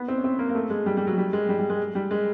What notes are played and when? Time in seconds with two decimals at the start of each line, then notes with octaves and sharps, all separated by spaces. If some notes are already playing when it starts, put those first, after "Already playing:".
Already playing: B3
0.08 C4
0.18 C#4
0.24 C4
0.39 A#3
0.49 A#3
0.55 A3
0.70 G#3
0.86 G3
0.97 G3
1.07 F#3
1.18 G3
1.33 G#3
1.49 G3
1.59 G3
1.70 G#3
1.95 G3
2.11 G#3